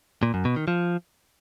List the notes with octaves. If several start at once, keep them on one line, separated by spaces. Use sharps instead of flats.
A#2
F#2
B2
D#3
F3